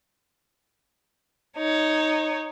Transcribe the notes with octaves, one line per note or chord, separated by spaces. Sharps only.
D#4 C#5